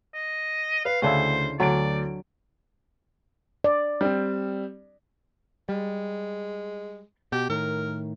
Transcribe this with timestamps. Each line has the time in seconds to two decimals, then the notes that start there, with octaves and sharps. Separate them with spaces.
0.15 D#5
0.85 B4 F5
1.02 D2 C#3 D4 E4 C5
1.60 D2 F#3 D4 D5 D7
3.64 D5
4.01 G3 C4
5.69 G3 G#3
7.32 B2 G4
7.50 A2 D#3 A#4